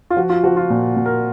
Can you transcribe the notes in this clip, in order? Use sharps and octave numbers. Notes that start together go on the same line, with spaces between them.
F4
F3 F#4
F4
F3 F#4
F4
A#2
A#2
A#4